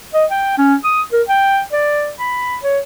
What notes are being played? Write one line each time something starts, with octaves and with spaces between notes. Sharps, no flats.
D#5
G5
C#4
D#6
A#4
G5
D5
B5
C#5